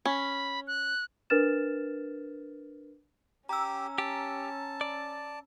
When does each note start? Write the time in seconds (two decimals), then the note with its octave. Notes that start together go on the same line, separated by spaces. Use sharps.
0.06 C#4 B5
0.67 F#6
1.30 D4 A#4 B4 F6 A6 E7
3.49 C#4 G4 A#5 E6
3.98 G4 A5
4.81 D5